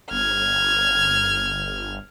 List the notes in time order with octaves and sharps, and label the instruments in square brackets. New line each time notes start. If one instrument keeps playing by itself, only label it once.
[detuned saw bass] G1 [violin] F6 G#6